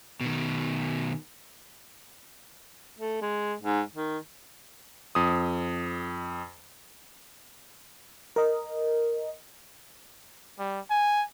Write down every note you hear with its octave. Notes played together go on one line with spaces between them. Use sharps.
B2 D#3
A3
G#3
G#2
D#3
F2 D#6
A#4 D#5
G3
G#5